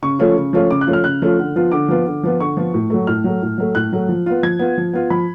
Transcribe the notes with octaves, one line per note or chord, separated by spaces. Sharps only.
C#3 C#6
F3 A3 C#4 F4
C#3
F3 A3 C#4 F4
C#3 D6
F#6
F3 A3 C#4 F4
F6
C#3 F#6
F3 A3 C#4 F4
D3
F3 B3 F4
D3 D6
F3 B3 F4
D3
F3 B3 F4
D3 C#6
F3 B3 F4
A2
F#3 A3
A2 F6
F#3 A3
A2
F#3 A3
A2 F#6
F#3 A3
F3
B3 F4
F3 G#6
B3 F4
F3
B3 F4
F3 B5